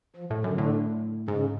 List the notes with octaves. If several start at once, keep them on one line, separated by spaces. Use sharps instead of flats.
F3
A2
F#2 D3
A2
G#2 C#3